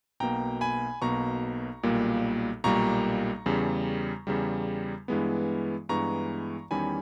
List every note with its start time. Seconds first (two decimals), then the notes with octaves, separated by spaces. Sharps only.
0.20 B1 B2 A#3 G5 A#5
0.61 G#5 B5
1.02 B1 B2 A#3 A#5 C#6
1.83 B1 A#2 G3 A#3
2.64 B1 A#2 G3 A#3 A#5 C#6
3.46 E2 C#3 G3
4.27 E2 C#3 G3
5.08 G2 E3 G#3 B3
5.89 G2 E3 G#3 B3 A#5 C#6
6.71 E2 D#3 G3 C#4 G#5 B5